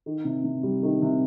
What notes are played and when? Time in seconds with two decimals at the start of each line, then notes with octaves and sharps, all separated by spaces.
0.06 D#3
0.25 C3
0.44 C3
0.63 G3
0.83 D#3
1.02 C3